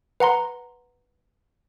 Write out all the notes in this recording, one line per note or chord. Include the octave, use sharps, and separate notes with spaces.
B4 F#5 A#5 C6